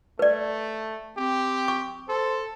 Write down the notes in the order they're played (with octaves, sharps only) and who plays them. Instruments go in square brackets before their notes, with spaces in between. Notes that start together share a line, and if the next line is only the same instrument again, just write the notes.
[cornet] A3 [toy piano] B4 D5
[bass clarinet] C4 [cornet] G4
[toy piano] C#6
[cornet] A4 [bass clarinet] C5